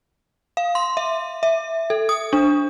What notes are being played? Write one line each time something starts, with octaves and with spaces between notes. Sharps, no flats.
F5
C6
E5
E5
A4
D#6
D4